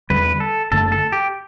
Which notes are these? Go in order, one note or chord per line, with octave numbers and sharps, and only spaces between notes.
E2 D3 G3 B4
A4
F#1 F#2 D3 A3 A4
A4
G4